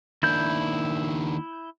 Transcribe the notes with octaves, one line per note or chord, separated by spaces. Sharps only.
D#3 A#3 D4 E4 G6